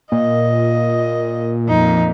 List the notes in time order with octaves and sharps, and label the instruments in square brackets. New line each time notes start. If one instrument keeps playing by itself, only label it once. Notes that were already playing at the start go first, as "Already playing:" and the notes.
[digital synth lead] A#2 [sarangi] D#5
[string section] F2 A#2 [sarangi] D#4